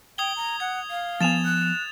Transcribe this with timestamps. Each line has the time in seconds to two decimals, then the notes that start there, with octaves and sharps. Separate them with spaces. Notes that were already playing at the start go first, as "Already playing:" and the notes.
0.18 G5 D#6 G#6 G7
0.36 A#5
0.60 F#5 G#6
0.90 F5
1.20 F3 B3 G#5 A6 E7 F7
1.45 F#6